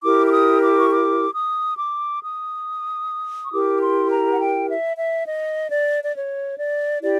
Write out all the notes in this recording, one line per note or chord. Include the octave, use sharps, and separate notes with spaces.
E4 G4 A#4 D6
D6
D#6
D6
C#6
D6
D#6
D6
D#6
C#6
E4 G4 A#4 D6
C6
A#5
F#5
G5
E5
E5
D#5
D5
D5
C#5
D5
E4 G4 D5